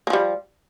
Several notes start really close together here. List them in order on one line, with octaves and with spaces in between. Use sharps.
A#3 F3 G3